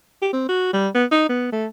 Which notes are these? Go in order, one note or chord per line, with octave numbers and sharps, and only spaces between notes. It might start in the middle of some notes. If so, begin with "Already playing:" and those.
G4
C4
F#4
G3
B3
D#4
B3
A3